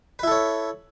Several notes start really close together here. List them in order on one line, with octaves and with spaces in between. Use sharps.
B4 E4 A4 C#5